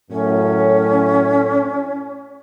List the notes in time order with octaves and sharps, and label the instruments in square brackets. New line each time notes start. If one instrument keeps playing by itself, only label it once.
[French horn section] F#2 A2 [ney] C#4